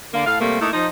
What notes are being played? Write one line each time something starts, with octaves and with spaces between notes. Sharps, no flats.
D3 A#3
A2 A4 F5
C3 G3 A3 A#3
A3 A#3 D#4 E4
F3 D#4